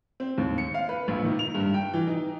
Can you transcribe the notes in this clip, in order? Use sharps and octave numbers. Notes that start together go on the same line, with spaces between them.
C4
D#2
C#7
F5
B4
A#1
D#3
F7
G2
G5
E3
D#4